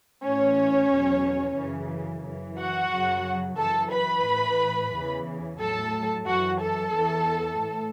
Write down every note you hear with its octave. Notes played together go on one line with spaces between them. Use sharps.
A2 E3 C#4 C#5
E2 B2 F#3
F#2 C#3 E3
F#2 E3
F#4 F#5
F#2 C#3 F#3
F#2 E3 A4 A5
B4 B5
A2 E3
E2 C#3 E3
A2 F#3 A4 A5
F#2 E3 F#4 F#5
A4 A5
E2 E3
A2